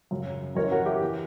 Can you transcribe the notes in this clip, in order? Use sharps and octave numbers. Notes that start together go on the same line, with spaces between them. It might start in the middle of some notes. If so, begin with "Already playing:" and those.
F#2 C#3 F#3
F#2 E3 A#4 C#5
F#4 A#4
E4 G4
E3